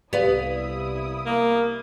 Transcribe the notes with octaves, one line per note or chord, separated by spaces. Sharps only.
C2 B3 E4 G4 D5 F5 D#6
A#3